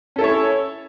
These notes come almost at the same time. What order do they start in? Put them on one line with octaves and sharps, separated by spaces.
C#4 A4 E4 C#5